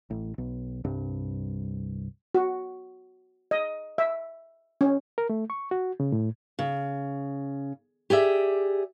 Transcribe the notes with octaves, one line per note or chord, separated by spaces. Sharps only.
A1
B1
C2 G2
F#4
D#5
E5
C#4
A#4
A3
C#6
F#4
C#3
A2
C#3
G4 G#4 D5 E5